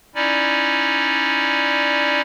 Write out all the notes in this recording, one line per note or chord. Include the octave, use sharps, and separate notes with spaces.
C#4 D#4 E4 D5